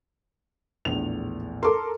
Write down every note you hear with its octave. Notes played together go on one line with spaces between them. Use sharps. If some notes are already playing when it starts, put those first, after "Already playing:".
A#1 E2 A2 F7
A4 A#4 C6 D6